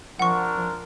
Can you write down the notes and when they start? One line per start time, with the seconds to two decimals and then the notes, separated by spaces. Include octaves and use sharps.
0.19 F3 C4 D4 A#4 F#5 C#6